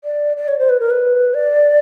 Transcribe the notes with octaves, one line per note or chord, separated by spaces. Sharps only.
D5
D5
C#5
C5
B4
A#4
B4
D5